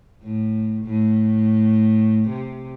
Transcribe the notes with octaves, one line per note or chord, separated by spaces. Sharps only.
A2
A2
C3